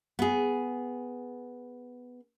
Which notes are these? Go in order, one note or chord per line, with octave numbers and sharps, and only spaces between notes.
B3 G#4